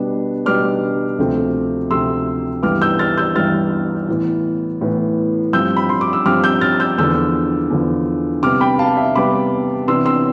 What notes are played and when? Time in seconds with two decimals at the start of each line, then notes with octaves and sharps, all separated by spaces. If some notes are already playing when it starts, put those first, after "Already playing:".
Already playing: B2 G3 B3 D4
0.46 B2 G3 B3 D4 D6 F6
1.18 D2 C3 F3 A3 C4
1.91 D2 C3 F3 A3 C4 C6 E6
2.63 G2 E3 G3 B3 D6 F6
2.82 E6 G6
2.99 F6 A6
3.17 E6 G6
3.36 G2 E3 G3 B3 F6 A6
4.08 A2 E3 B3
4.81 A2 E3 B3
5.53 G2 F3 C4 E6 G6
5.77 B5
5.89 C6
6.01 D6
6.13 E6
6.26 G2 F3 C4 D6 F6
6.44 E6 G6
6.61 F6 A6
6.80 E6 G6
6.98 E2 D3 F3 E6 G6
7.70 E2 D3 F3
8.43 C3 G3 B3 D6 F6
8.61 G5 B5
8.79 F5 A5
8.97 E5
9.15 C3 G3 B3 B5 D6
9.88 C3 E3 B3 D4 C6 E6
10.06 C6 E6